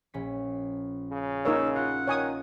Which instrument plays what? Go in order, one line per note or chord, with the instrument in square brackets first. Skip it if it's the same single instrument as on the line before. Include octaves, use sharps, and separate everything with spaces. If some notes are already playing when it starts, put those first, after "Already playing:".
[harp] A#1 C#4 B6
[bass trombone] C#3
[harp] A#3 C#4 F4 [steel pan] D#4 A#4 C#5 [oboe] E6
[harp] F4 [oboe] F#5
[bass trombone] D#3 [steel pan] C#5 G#5 D#6